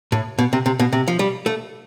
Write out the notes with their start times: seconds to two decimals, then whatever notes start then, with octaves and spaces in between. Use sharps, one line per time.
0.12 A2
0.39 B2
0.53 C3
0.66 C3
0.79 B2
0.93 C3
1.08 F3
1.19 G3
1.46 A3